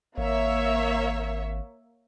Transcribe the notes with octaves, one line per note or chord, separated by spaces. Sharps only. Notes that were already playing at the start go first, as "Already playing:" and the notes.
G#1 A#3 C#5 E5